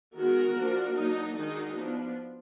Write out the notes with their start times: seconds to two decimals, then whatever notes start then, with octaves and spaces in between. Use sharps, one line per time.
0.15 D#3 G#3 B3 F#4 A#4
0.57 F3 A#3 D4
0.96 F#3 A#3 D4 D#4
1.36 D#3 G#3 D4 D#4 F#4
1.76 F3 B3 D4